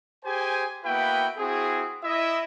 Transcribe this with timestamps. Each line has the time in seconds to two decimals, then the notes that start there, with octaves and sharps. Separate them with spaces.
0.24 G4 G#4 C5 G#5
0.84 A#3 B3 E4 F#4 B4 G5
1.37 C4 E4 F#4 G#4
2.03 E4 D#5 E5